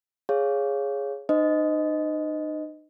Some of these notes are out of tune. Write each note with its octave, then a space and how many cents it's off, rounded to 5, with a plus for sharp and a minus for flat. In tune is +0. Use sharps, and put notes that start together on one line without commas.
G#4 +0 C#5 +0 F5 +0
D#4 -40 C5 -40 D#5 +0